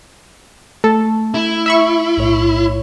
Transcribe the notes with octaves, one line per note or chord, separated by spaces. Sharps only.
A3 A4
E4
E5 B5 C#6
B1 A2 C#5